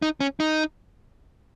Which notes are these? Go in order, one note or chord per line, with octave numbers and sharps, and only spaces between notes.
D#4
C#4
D#4